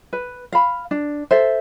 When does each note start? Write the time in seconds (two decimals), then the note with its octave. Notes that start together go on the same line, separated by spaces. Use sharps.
0.13 B4
0.52 F5 B5
0.91 D4
1.31 A4 C5 E5